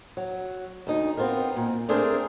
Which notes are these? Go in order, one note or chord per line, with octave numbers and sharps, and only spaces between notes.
F#3
D2 D#4
B3 C4 F4 G#4 A#4
A#2
A3 C4 D4 G#4 A#4 C5